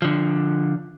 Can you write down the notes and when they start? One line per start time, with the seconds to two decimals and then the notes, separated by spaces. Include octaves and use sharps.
0.02 D3 F3